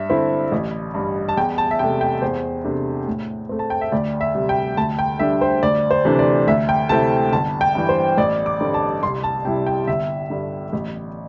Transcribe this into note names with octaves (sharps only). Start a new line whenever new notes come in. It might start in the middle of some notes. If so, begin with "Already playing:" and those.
Already playing: G2 E5
D3 C4 E4
A1
G2 G3
A5
E2 G5
A5
E5
C3 A3 G5
G5
E2 C5
C3 A3 D4
A2
A3 C4
A5
G5
E5
D2 D5
E5
C3 G3
G5
D2 A5
G5
D3 G3 D4 E5
C5
D2 D5
C5
C3 E3 A3 D4
D5
D2 E5
G5
C3 A3 C4 E4 A5
G1 A5
G5
G2 E3
C5
A1 D5
D6
G2 D3 G3 C4
A5
C2 C6
A5
C3 G3 E4 G5
G5
G1 E5
G2 D3
A1